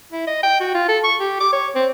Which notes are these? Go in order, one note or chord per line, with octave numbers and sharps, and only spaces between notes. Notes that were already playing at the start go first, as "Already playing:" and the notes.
E4
D#5
G5
F#4
F4
A4
C#6
G4
D6
C#5
C4